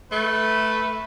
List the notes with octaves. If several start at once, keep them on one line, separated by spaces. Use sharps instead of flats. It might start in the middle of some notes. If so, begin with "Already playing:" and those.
A3 B4